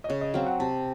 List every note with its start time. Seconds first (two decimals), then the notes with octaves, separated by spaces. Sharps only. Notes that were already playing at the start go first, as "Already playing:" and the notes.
0.04 D#5
0.09 C#3 C#5
0.21 D#5
0.34 F#3 C4 F5
0.47 F#5
0.60 C3 A5